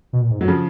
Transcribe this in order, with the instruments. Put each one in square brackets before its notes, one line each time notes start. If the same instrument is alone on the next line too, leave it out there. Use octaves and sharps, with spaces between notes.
[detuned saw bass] B2
A#2
G#2
[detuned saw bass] F#2 [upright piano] F#3
[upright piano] C#3 F3